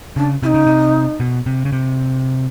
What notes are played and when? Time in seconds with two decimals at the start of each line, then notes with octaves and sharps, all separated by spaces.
0.16 C#3 D4
0.43 C3 E4
0.46 D#4
0.54 C#3
0.67 C3
1.20 B2
1.46 C3
1.65 C#3
1.72 C3